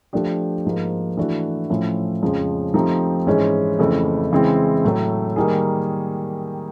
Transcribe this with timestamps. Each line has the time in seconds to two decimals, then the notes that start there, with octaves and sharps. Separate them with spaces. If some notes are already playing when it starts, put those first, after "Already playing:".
0.13 F3 A3 D4 G4
0.66 G#2 F3 A#3
1.17 E3 A3 D4 F#4
1.70 A2 F3 A3 C#4 E4
2.22 F2 C#3 F3 G#3 C#4
2.74 F3 A3 C4 D#4 G4
3.27 G#2 E3 G#3 C#4
3.79 F2 C#3 E3 A3
4.31 C#3 E3 G#3 C4
4.84 A2 F#3 A3
5.36 D#3 G3 A#3 D#4 G#4